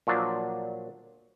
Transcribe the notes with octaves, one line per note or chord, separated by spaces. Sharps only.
A#2 F3 F#3 D4